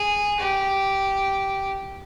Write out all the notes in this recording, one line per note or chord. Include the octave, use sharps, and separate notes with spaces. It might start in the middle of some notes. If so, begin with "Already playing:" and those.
Already playing: G#4
G4